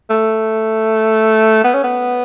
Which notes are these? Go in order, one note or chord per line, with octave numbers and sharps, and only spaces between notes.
A3
B3
C#4
B3